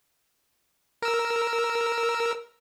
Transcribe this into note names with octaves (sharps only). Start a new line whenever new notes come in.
A#4 E6